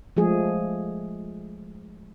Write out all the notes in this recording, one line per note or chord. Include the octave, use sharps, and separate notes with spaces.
F3 G#3 A3 G#4